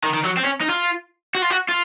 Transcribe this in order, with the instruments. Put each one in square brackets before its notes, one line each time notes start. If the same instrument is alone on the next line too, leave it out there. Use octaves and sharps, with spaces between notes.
[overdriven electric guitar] D#3
D#3
F#3
C4
C#4
D#4
F4
F#4
F4
F#4
F4